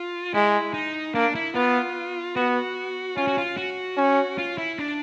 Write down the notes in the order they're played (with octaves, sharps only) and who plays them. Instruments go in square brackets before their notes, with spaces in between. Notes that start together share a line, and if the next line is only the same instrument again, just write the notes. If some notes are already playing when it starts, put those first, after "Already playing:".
Already playing: [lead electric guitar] F4
[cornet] G#3 [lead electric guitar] E4
[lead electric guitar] D#4
[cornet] A#3 [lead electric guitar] D4
[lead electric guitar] E4
[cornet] B3 [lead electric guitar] F4
[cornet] B3 [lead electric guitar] F#4
[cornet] C#4 [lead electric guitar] F4
[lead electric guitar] F#4
F4
F#4
[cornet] C#4
[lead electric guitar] F4
E4
D4